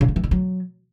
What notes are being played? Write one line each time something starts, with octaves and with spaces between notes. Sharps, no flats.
C#3
C3
E3
D3
F#3